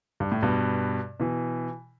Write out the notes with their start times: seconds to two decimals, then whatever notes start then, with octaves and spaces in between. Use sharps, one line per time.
0.20 G2
0.32 A2
0.43 G2 B2
1.20 B2 E3